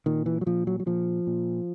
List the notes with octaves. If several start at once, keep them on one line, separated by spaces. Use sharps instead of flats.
A#2 D#3
E3
F#3
A#2 F3
F#3
F#3
A#2 F3
A#2